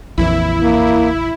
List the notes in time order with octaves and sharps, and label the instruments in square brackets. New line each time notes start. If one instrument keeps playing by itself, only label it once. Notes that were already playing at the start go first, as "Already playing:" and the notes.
[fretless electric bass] A#1 F2 E3 [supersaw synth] E4
[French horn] A#3